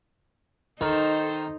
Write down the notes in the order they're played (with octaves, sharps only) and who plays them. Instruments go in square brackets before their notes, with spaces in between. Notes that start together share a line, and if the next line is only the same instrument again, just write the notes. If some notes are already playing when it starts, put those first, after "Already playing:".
[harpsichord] D#3 [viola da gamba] D#4 [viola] A4 C5